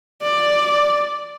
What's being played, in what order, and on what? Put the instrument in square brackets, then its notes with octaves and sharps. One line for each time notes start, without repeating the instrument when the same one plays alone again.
[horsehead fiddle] D5